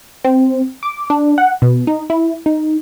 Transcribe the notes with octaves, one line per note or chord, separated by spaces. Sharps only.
C4
D6
D4
F#5
B2
D#4
E4
D#4